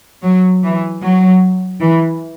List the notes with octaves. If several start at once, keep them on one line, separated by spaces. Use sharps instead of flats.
F#3
E3
F#3
E3